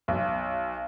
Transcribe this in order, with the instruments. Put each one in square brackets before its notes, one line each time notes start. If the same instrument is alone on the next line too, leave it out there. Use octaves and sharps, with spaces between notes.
[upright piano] B1